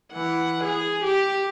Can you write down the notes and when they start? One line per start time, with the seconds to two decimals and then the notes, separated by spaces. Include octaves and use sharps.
0.12 E3 F#5
0.64 G#4
1.04 G4